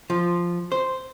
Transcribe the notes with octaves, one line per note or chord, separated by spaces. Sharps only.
F3
C5